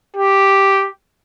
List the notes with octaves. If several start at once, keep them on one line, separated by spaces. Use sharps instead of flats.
G4